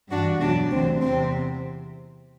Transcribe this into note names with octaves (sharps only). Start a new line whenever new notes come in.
G2 E3 D4 F#4
E2 B2 F#3 D4 F#4
D2 C3 E3 C4
E2 C3 C4